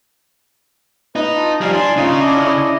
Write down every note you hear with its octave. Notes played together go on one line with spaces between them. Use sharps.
D#4 B4
F4 A5
F3 G3 F5 G#5 A#5
D4 G#5 C6
C#3 D#4 F4
D4 E4 D#5